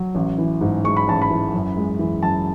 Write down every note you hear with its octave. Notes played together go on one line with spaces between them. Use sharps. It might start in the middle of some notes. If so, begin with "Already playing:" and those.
Already playing: F#3
A1
E3
G#2
G#3 C#6
B5
A1 A5
B5
E3
F#2
G#3
E3
F#2 A5